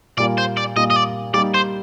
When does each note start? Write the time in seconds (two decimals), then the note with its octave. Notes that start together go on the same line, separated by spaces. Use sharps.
0.17 A#2 G3 A#3 F4 D5
0.38 C5
0.57 D5
0.76 A#2 G3 A#3 F4 D#5
0.90 D#5
0.96 D5
1.34 G3 A#3 D#4 G4 D5
1.54 C5